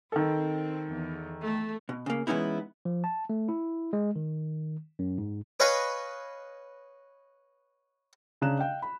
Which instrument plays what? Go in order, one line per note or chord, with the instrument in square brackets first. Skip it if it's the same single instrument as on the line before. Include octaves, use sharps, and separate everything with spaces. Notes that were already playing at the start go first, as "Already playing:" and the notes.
[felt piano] D#3 A4 [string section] C4
[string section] E2
A3
[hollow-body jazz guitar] B2
C#3 A#3
E3 G#3 B3 C#4 D#4 E4
[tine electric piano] F3
A5
A3
E4
G#3
D#3
F#2
G#2
[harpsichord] B4 C#5 D#5 F5 G#5
[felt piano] C#3 D4 D5 A#5 F#6 E7
D#5 F5 G5
B5